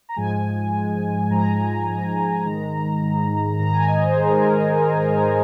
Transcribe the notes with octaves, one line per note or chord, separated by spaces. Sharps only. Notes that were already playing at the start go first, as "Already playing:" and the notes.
A#5
G#2 F3 G#3 G#5
G#2 F3 G#3
G#2 F3 G#3 A#5
G#2 F3 G#3
G#2 D#3 G#3
G#2 D#3 G#3
G#2 D#3 G#3 A#5
G#5
D#5
C5
G#2 D#3 G#3 G#4
A#4